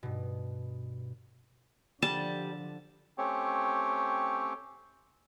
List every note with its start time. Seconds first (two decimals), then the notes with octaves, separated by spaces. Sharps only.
0.03 G2 B2
2.02 D3 F3 G3 A5
3.18 A3 C4 C#4 G4 C#5